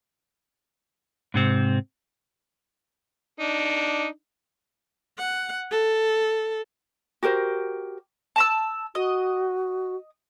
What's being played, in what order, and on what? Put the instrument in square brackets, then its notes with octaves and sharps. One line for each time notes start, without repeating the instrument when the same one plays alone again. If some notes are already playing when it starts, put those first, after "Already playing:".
[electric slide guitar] G#2 C3 C4
[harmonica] D4 D#4
[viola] F#5
A4
[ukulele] F#4 G4 A#4 C5
[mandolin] A5 A#5 E6
[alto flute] F#4 [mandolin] D#5